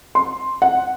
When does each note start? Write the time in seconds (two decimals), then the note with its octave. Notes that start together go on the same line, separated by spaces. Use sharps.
0.15 C6
0.62 F#5